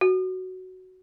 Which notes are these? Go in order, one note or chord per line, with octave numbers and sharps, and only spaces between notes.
F#4